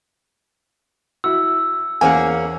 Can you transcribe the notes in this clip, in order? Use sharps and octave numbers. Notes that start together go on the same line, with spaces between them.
E4 F#4 E6
E2 A#3 C#4 G#4 C5 F#5 G#5